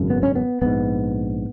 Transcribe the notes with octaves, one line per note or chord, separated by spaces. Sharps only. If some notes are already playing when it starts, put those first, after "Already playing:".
Already playing: G#1 F#2 C#3
B3
C#4
B3
A#1 G#2 B3